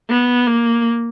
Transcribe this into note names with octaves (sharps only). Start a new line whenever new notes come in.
B3
A#3